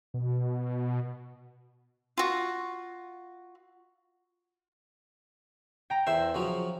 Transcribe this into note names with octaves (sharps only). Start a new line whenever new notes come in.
B2
F4 F#4
G5 A#5
E2 C5 E5
C#3 F3 F#3